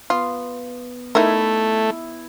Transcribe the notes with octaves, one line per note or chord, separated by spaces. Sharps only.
B3 F4
A3 D#4 E4 A#4